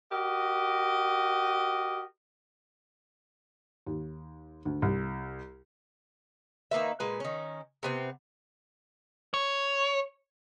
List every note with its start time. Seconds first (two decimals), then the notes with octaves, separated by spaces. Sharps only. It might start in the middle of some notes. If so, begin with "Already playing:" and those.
0.11 F#4 G4 A#4 D#5
3.86 D#2
4.65 D2
4.82 C2
6.71 D#3 A#3 B4 E5
7.00 A#2 G#3 B4 G#5
7.20 D#3 C#4
7.83 C3 B3 C4
9.34 C#5